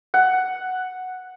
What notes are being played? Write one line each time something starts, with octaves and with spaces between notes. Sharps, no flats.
F#5